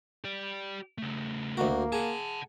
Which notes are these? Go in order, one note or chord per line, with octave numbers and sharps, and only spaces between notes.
G4 D5
C#3 A3
D2 A#3 F#4
G#4 F#5 A5